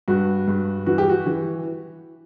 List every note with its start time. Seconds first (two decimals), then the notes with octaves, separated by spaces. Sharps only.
0.08 G2 F#4
0.48 G2
0.86 E3 F#4
0.98 G4
1.09 F#4
1.26 E3